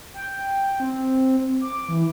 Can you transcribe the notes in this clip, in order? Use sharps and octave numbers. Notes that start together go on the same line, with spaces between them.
G5
C4
D6
E3